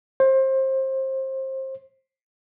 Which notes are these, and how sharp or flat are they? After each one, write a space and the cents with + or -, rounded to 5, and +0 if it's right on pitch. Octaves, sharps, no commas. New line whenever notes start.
C5 +25